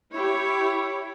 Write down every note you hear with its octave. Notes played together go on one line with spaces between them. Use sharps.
E4 G4 C#5